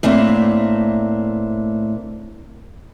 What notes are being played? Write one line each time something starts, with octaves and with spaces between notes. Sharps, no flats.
A2 A3 A#3 C4 D4